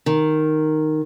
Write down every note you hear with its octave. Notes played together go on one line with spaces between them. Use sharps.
D#3